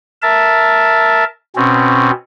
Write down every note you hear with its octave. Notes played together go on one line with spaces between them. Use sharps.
A#4 E5 A5
B2 C4 C#4